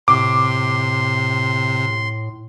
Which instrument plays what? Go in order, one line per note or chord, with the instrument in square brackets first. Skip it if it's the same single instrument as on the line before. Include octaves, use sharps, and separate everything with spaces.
[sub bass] A2 [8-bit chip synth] C3 [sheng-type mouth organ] C6 [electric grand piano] D6